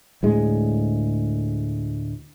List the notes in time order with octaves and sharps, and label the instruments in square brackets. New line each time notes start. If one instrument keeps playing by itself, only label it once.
[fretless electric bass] D2 A2 G#3